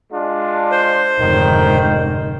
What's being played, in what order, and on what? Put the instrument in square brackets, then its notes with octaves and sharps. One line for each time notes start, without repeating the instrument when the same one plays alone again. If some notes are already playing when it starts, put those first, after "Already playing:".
[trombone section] G#3 D4 F4
[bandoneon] C5
[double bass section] F1 G#2 D3 [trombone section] D#3